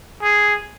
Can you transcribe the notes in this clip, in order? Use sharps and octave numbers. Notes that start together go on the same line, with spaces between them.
G#4